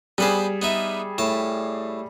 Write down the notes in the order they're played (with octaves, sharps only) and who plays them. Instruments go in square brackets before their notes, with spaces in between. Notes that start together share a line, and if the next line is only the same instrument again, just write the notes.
[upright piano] G3 G#4 [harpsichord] B3 B4 C5
[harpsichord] B3 D#4 E5
A2 A5